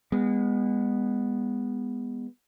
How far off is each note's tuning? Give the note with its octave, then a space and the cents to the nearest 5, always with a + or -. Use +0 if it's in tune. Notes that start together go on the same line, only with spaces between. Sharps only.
G#3 -30 B3 +0